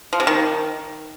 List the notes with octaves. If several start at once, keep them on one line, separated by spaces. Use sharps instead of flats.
F3
C3
D#3